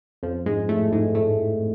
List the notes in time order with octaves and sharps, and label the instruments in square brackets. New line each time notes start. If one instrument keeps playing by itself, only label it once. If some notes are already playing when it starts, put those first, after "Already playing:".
[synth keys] F2 F3
G#2 G#3
A2 A3
G#2 G#3
A2 A3